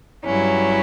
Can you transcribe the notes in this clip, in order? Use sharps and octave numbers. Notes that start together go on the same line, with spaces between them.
G2 F#3 C#4 E4